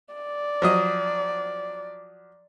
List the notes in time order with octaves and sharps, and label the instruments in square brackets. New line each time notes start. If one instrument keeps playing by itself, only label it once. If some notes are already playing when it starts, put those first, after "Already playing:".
[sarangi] D5
[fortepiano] F3 F#3 D#5